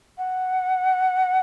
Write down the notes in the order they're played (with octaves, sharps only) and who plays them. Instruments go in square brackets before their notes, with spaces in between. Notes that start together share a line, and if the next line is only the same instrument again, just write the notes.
[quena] F#5